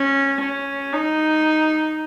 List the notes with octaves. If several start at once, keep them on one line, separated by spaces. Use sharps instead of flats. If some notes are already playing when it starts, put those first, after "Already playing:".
Already playing: C#4
C#4
D#4